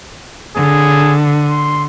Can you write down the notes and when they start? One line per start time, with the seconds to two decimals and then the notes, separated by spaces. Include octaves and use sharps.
0.56 D3 G#4
1.50 C6